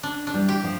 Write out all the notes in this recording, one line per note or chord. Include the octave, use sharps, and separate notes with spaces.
D4
D4
E3 G3
G4
F3 A3